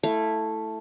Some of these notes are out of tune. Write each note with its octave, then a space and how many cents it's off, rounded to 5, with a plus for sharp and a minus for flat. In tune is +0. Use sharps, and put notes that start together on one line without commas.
A3 +0 E4 +0 F5 -20